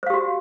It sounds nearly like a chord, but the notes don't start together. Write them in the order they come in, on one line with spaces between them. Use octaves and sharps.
C5 F5 G4 F#4